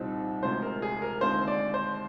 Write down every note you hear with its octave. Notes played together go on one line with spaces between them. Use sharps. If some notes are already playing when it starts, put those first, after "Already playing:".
Already playing: C2 A#2 F3 C4 D#4
D2 C3 F3 G#3 C5
A#4
G#4
A#4
D#2 D3 G#3 C4 F4 C5
D5
C5